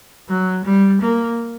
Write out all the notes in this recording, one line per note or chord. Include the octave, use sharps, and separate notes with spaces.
F#3
G3
A#3